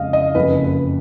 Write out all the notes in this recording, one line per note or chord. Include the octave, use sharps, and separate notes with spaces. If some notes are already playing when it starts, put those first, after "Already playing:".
Already playing: F2 C#3 G#3 D#5 F5
D#5
F#1 F2 C#3 B4
B4